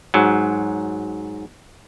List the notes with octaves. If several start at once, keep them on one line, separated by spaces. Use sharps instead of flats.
G#2 F#3